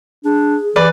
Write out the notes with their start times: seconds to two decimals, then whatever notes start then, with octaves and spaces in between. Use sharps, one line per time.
0.25 D4 G#4
0.76 E3 B4 D5